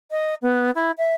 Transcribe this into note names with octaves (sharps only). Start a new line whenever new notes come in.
D#5
B3
E4
E5